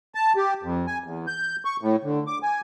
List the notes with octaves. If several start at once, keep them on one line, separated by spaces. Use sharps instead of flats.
A5
G4
F2
G#5
E2
G6
C#6
A2
D3
D6
G#5